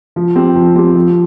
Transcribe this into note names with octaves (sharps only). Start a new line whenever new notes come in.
F3
C4 G4
F3
C4 G4
F3